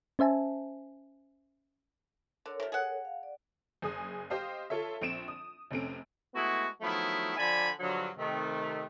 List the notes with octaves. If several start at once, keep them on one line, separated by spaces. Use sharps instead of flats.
C#4 C5 E5 G#5 A5
D3 A4 A#4 C#5
C3 F3
G#4 F#5
F5
D5
F#1 G#4 D#6
G4 C5 D#5 F5
F4 A4 C#5 E5
A#1 C4 D7 E7
D#6
F1 C3 A3 C4 C#4 D7
G#3 A3 B3 E4 F#4
D#3 F3 F#3 A3 B3 E4
D3 F3 D5 G#5 A5 B5
G2 D3 F3 F#3
C3 D#3 A3